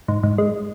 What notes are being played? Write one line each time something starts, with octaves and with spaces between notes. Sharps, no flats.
G#2
G#2
G#3